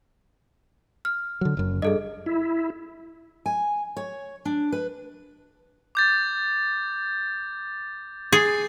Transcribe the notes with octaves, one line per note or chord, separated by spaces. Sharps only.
F6
D3 F#3
F#1 F#2
G2 G#4 A4 D#5
E4
G#5
C#5
D4
B4
D6 G6 A6
G#4 A6 C7